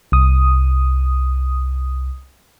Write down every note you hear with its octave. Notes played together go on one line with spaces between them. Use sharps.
C2 D#6